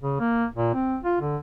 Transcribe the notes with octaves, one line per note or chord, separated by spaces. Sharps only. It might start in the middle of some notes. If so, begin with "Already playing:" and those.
C#3
A#3
A#2
C4
F4
D3